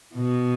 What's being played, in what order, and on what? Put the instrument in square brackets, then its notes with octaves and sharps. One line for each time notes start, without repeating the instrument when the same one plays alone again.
[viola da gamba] B2